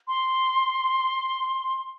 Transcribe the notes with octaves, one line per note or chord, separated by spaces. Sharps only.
C6